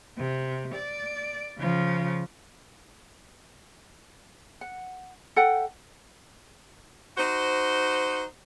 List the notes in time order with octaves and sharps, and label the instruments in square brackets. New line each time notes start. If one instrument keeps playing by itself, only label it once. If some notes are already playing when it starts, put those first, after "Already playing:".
[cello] C3
D5
C#3 F3
[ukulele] F#5
A4 E5 F#5 G5
[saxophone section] D#4 F#4 C5